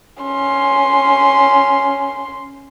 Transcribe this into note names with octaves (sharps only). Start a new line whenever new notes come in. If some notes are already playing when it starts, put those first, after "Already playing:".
C#4 C6